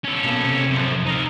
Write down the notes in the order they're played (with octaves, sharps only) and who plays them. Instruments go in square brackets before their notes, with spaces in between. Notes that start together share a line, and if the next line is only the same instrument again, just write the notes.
[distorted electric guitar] C#4 A4
[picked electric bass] B2 A#3 B3
C3
[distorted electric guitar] F#2 F3
D#4 F5